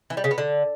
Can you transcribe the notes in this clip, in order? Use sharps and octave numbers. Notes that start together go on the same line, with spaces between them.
E3
G3
C#3
B3
D3